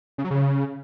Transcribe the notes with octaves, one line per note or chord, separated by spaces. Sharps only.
C#3
F#3
C#3